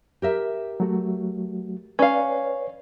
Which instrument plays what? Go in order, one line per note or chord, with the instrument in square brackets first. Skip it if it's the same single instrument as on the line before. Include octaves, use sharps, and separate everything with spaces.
[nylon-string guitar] G4 A#4 E5
[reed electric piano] F#3 A3 F#4
[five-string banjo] C#4 F5 [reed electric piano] B4 C#5 D5